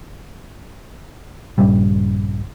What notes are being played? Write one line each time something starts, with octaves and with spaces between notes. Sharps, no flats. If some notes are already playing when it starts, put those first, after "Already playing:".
A#1 G2 C#3 G3